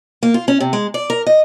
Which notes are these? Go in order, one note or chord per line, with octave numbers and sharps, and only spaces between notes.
A#3
F4
C#4
C3
G#3
D5
A#4
D#5